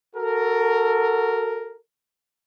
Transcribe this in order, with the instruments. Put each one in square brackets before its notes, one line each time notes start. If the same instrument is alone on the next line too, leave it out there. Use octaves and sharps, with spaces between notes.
[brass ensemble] F#4 A4 A#4